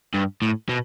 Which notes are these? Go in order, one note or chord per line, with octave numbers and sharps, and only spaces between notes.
G2
A2
B2